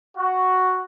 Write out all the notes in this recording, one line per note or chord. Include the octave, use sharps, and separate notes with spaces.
F#4